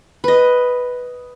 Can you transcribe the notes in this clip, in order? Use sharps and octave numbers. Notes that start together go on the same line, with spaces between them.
B4 D#5